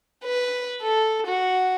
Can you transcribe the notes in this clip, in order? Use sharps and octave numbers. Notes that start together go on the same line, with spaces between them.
B4
A4
F#4